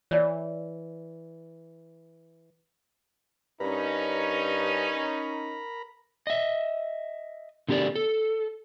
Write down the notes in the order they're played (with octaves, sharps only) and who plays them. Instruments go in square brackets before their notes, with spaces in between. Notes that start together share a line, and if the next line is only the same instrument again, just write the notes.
[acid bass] E3 [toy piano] C#5 D5
[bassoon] G2 [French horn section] C#4 D#4 [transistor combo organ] A#4 A#5 B5
[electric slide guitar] D#5 E5
D3 B3 G4 A#4 D5
A4